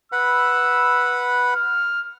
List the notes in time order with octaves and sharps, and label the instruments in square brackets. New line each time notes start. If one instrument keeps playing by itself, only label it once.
[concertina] B4 F#5 B5 [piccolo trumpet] E6
[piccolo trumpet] F6